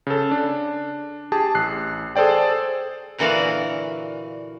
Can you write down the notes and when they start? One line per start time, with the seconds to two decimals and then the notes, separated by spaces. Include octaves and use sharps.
0.07 C#3 A4
0.31 D4
1.32 G4 G#4 A5
1.55 A1 F#6 C7
2.16 G#4 A4 C5 D5 G5
3.18 A#2 D3 E3 F#4 D5 F5